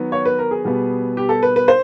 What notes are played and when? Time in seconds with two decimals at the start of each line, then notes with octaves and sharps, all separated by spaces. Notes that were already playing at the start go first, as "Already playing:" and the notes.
Already playing: D#3 F#3 B3
0.12 C#5
0.25 B4
0.39 A#4
0.51 G#4
0.65 B2 G3 B3
1.17 G4
1.29 A4
1.43 B4
1.56 B4
1.68 C5